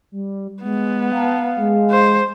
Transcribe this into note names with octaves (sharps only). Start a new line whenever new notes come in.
G3
G#3 B3
F5 G5 A5 A#5
G#3
C5